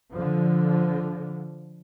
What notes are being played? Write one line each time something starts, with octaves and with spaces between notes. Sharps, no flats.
D3 F3